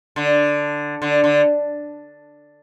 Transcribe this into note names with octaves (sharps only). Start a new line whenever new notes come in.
D3
D3
D3